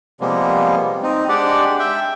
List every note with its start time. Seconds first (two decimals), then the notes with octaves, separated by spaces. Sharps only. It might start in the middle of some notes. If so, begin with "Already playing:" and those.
0.21 C3 F3 G3 G#3 A#3 B3
1.03 C4 D#4
1.29 G#3 D4 G4 D5 F#5
1.79 E5 G5